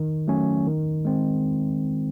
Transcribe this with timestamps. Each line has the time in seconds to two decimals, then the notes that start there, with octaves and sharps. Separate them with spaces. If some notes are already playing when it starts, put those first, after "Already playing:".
Already playing: D#3
0.28 F#3 A3 C#4
0.67 D#3
1.05 G#3 C4